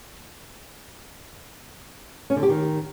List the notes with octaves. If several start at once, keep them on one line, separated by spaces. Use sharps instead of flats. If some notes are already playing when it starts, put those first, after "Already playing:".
C#4
D3
G4
D#3